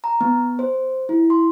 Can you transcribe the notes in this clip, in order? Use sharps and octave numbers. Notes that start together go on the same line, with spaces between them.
A#5
B3
C5
E4
C6